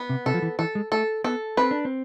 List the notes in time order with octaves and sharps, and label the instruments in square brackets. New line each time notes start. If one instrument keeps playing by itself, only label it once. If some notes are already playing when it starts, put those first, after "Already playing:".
Already playing: [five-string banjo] B3
[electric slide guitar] C3
[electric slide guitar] C3 [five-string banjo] A4
[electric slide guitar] F3
E3
[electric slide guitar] E3 [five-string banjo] A4
[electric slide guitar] G#3
[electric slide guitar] A3 [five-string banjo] A4
[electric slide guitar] B3 [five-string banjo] A4
[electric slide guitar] C4 [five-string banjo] B4
[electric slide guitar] D4
C4